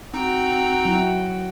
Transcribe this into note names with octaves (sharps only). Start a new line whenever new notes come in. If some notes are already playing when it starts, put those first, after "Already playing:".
C4 D#4 F#4 G5 A#5
F#3 E4